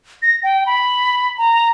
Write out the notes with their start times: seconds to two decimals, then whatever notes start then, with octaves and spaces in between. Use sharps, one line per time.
0.22 A#6
0.43 G5
0.66 B5
1.38 A#5